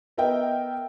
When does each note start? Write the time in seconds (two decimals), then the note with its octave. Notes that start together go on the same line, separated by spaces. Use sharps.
0.17 B3 A#4 D#5 E5 G5